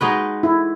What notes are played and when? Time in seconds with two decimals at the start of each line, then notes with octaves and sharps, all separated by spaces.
0.01 G#3 D#4 F#4 B4
0.43 E4